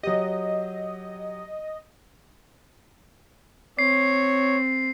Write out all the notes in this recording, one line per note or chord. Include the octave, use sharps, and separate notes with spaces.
F#3 G4 D#5
C4 C#5 C7